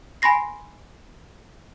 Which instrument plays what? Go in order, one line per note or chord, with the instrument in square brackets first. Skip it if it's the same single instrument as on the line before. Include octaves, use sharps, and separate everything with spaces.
[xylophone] G#5 B5 C6 A#6 C7